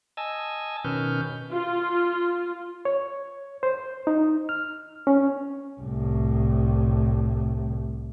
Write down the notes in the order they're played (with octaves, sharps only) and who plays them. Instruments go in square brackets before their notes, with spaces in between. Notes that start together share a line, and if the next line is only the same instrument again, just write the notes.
[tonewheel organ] D#5 G#5 A5 E6
B2 D#3 C#4 B4 F6 G6
[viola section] F4
[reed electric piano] C#5
C5
D#4
F6
C#4
[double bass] C2 A2